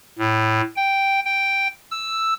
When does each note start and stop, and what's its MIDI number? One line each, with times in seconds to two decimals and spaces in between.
0.19 0.61 45
0.76 1.20 79
1.25 1.67 79
1.91 2.34 88